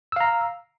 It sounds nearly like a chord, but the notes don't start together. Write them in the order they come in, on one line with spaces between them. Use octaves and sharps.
E6 F5 A#5